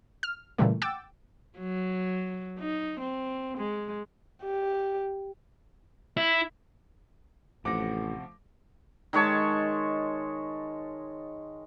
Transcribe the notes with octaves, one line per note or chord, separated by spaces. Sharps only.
F6
A#2 C#3 E3 G3 A3
F#5 G5 D6 E6 A6
F#3
D#4
C4
G#3
G4
E4
A1 C3 F3 A3 F#5 D6 A#6
D#3 G#3 C#5 A5